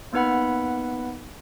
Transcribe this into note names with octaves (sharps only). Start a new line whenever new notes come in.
A#3 B3 D#4 B4 F#5 B5